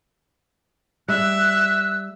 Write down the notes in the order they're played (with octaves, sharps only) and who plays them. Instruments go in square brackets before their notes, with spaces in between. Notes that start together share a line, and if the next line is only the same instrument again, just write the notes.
[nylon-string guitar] G3 [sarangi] E5 [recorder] E6 [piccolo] F#6